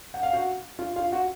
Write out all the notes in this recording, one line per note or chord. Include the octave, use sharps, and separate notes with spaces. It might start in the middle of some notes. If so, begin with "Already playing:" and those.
F#5
F5
F#4 F#5
F4 F5
F4 F5
F#4 F#5